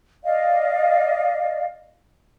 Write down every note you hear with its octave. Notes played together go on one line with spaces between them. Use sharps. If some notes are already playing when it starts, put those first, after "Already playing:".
D5 D#5 F5